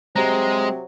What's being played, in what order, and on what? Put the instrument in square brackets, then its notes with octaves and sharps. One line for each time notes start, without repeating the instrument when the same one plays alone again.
[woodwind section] C3 F#3 [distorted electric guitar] G#3 [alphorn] C4 [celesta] A#5 A#6